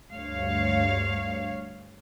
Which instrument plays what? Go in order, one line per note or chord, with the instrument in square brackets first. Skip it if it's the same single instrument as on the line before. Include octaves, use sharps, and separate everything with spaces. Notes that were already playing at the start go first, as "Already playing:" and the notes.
[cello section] D2 G2 C#5 F5